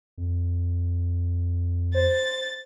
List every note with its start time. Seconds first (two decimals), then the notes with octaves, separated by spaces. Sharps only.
0.18 F2
1.94 C5 A6